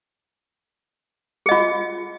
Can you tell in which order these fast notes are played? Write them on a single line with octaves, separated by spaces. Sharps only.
G#4 D#5 F4